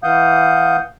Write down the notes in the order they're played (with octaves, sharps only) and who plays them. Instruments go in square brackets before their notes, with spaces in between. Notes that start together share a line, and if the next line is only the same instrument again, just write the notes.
[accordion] E3 F5 F#5 D#6 G6